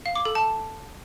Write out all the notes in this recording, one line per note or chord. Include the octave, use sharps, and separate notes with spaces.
F5
D6
A4
A5